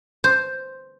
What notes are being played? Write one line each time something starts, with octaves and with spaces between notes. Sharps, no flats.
C5